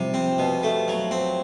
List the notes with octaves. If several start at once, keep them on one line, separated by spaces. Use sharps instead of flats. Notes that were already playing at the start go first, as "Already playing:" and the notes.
Already playing: C3 F3 G3
C4
B2
A3
F#3
C4